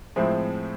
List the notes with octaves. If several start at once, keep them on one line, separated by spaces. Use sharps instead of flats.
A2 F3 G#3 C4 E4